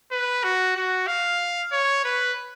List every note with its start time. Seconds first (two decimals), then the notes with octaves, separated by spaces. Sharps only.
0.12 B4
0.44 F#4
0.76 F#4
1.07 F5
1.72 C#5
2.04 B4